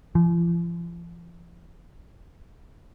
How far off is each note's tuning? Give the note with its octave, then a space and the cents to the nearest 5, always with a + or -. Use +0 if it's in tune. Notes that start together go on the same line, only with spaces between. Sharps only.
F3 -40